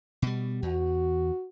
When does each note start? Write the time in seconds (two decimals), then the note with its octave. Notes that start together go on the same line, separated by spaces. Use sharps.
0.22 B2 G3
0.62 E2 F#4